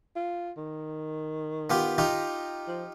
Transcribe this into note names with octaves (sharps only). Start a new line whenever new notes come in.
F4
D#3
B3 F4 G4
D#4 F4 G4
F3